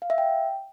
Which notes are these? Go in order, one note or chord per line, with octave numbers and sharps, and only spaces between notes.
F5
E5
G5